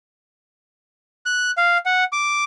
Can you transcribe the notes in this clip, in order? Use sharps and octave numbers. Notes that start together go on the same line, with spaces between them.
F#6
F5
F#5
D6